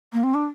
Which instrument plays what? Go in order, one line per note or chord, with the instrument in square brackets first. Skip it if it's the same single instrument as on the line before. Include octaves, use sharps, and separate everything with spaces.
[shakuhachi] A#3
C4
D4